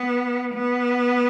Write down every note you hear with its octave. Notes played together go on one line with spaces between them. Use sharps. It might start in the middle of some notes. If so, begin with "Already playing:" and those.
Already playing: B3
B3